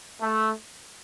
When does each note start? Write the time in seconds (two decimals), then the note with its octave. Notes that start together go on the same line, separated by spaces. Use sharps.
0.22 A3